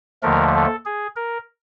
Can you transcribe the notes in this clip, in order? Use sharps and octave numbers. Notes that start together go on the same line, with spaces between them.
D#2 D3 F3 A3 A#4
A4
G#4
A#4